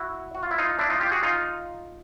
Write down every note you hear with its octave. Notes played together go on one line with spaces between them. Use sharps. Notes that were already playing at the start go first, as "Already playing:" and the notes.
Already playing: E4 F#4
F#4
F4
E4
D#4 F4
D4 E4
D#4 F4
F4 G4
F#4 G#4
D#4 F4